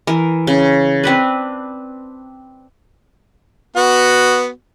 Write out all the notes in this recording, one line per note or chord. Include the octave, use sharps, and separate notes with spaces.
E3 A#4
C#3
C4 D4 B4
B3 F#4